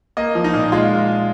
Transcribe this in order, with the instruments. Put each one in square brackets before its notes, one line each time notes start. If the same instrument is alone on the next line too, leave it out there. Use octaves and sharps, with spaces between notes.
[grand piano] A#3 D#5
F3
D#4
A#2
G#3 F4